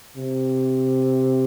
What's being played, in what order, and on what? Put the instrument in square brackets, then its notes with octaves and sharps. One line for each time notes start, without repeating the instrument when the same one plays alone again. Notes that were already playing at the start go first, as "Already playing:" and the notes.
[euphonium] C3